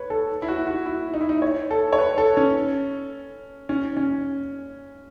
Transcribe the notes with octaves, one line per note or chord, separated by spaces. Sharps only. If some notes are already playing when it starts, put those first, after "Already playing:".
Already playing: B4 C#5
A4
E4
F#4
F#4
E4
D#4
E4
D#4
C#5
A4
C#5
B4
A4
C#4
C#4
C#4